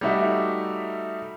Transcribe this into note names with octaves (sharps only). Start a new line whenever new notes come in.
G3 A3 D#4 F#4 E5